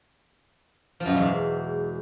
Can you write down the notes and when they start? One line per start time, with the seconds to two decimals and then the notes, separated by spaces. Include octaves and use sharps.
1.00 F3
1.06 F#2
1.11 B2
1.17 E2
1.22 G#2